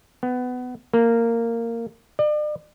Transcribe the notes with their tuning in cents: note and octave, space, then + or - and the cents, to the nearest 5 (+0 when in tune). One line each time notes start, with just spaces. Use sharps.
B3 +20
A#3 -15
D5 +40